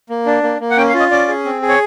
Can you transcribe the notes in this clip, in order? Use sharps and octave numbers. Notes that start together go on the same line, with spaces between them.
A#3
D4
A#3
A#3
F#5
C#4 G5
F5
F4
D#5
C#4 D5
G#4
C4
G#4
C#5